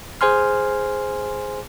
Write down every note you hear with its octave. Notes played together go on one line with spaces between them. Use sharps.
G#4 C5 G#5 C6 F6